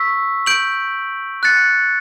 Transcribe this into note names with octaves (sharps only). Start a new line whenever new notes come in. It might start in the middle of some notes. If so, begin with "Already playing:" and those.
Already playing: C#6 E6 B6
G6 D7 F#7
F#6 A6 C#7